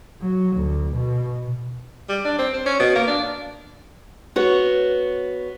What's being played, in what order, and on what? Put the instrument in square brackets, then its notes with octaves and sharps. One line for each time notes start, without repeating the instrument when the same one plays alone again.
[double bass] F#3
D2
B2
[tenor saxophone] G3
D4
C4
C5
C#4
B2
A#3
D4
[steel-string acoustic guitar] B3 F#4 C#5